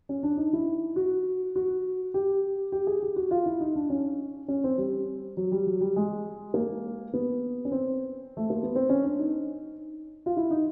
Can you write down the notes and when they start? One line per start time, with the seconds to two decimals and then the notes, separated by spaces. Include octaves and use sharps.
0.09 C#4
0.23 D4
0.37 D#4
0.53 E4
0.96 F#4
1.56 F#4
2.14 G4
2.72 G4
2.87 G#4
3.03 G4
3.16 F#4
3.31 F4
3.46 E4
3.60 D#4
3.76 D4
3.90 C#4
4.48 C#4
4.64 C4
4.78 G3
5.37 F#3
5.52 G3
5.66 F#3
5.81 G3
5.96 G#3
6.54 A#3
7.13 B3
7.65 C#4
7.72 C4
8.37 A3
8.50 A#3
8.63 B3
8.75 C4
8.89 C#4
9.04 D4
9.19 D#4
10.26 F4
10.37 E4
10.51 D#4